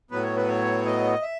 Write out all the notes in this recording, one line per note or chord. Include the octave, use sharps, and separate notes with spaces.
A2 F#3 B3 B4
C#5
B4
C#5
D#5
E5